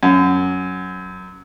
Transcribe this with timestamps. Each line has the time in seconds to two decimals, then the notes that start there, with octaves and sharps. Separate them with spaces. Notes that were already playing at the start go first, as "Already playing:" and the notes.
0.03 F#2